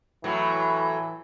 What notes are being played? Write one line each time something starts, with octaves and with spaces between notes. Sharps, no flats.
A2 E3 F#3